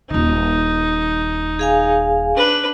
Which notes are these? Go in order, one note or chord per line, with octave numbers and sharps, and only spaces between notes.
D#1 D#3 D#4
G#4 F5 G#5
D4 B4